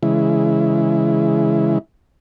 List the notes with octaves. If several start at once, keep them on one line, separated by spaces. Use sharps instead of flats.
C#3 E3 G#3 E4